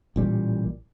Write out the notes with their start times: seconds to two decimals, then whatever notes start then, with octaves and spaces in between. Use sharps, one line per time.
0.16 A1 A#2 G3